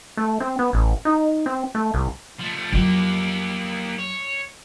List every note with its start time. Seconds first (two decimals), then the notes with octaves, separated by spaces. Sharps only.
0.17 A3
0.40 C4
0.59 B3
0.73 A1
1.05 D#4
1.46 C4
1.75 A3
1.94 C2
2.39 F3 A3
2.72 F2 F#3 A#3 G4
3.98 C#5